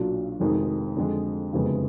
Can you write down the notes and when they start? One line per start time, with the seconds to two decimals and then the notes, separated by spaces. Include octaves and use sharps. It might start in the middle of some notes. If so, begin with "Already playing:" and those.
Already playing: B1 A#2 F#3 D4 F4
0.40 F1 F2 D#3 G#3 D#4
0.97 F2 D3 G#3
1.53 F#1 F2 D3 G#3 B3